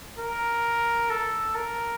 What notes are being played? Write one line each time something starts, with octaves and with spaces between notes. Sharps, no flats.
A#4
A4
A#4